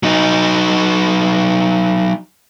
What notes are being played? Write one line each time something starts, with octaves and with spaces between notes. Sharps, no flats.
F#3 D#4